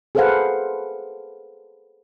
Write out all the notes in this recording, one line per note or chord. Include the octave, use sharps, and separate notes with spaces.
G#4 A4 B4 C5 F5 F#5